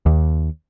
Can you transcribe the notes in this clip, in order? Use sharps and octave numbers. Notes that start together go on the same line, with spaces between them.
D#2